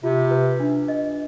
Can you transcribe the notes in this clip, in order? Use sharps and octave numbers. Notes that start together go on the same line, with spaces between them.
C3 F4
B4
D4
D#5